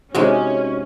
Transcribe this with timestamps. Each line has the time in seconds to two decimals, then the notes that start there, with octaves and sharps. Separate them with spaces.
0.15 C3 G#3 C#4 D#4 F#4